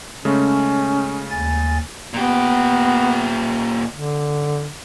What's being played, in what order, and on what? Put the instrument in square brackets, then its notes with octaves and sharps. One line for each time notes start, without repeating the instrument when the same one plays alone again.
[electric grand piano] C#3 G#3 A3 [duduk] C#4
[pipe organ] D#2 G#5 A6
[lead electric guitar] A#2 G4 [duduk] B3
[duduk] D3